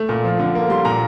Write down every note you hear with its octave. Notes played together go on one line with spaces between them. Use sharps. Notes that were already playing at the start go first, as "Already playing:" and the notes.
Already playing: A3
A#2
F3
D3
A#3
G3 C6
A#2 A#5